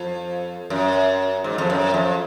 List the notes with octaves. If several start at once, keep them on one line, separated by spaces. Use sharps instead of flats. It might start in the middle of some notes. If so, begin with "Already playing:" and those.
Already playing: F2
F#2
G#2
F2
F#2
F2